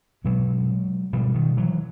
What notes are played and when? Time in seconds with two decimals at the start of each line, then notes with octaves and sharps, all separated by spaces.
0.24 B2 F#3 G#3
1.13 B2 F3 G3
1.35 D#3
1.57 E3 F#3